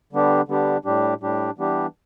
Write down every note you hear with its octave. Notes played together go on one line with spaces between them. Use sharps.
D3 G3 B3 D4 G4
D3 G3 B3 D4 G4
A2 G3 D4 G4
A2 G3 D4 G4
E3 G3 B3 D4 G4